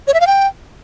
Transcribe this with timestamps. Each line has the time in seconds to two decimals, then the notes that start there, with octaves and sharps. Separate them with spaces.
0.07 C#5
0.14 E5
0.21 F5
0.27 G5